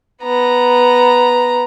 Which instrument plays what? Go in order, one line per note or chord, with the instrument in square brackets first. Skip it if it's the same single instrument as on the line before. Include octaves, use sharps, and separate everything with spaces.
[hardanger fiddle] B3 A#5